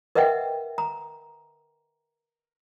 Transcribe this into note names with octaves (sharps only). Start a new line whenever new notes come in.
A#4 B4 D#5 E5 F#5 G5
A#5